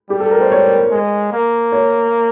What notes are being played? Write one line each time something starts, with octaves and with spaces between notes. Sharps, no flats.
G3 G4
A4
A#4
C5
C#5
G#3
A#3
C#5